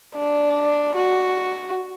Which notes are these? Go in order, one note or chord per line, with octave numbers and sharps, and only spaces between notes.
D4
F#4